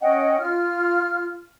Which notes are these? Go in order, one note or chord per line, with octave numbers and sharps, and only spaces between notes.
C#4 D#5 F#5 G5
F4 F6